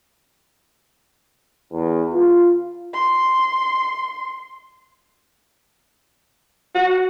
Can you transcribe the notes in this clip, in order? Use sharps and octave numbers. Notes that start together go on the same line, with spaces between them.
E2
F4
C6
F#4